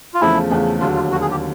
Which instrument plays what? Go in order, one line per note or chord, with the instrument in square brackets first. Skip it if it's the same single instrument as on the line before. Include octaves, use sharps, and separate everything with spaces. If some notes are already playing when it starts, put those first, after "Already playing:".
[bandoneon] F4
[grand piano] E2 C#3 F3 A3 [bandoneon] E4
[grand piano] E2 C#3 F3 A3
[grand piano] D#2 D3 F#3 [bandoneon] F4
[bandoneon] F4
[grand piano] D#2 D3 F#3 [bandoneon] F#4
[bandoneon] G#4
G4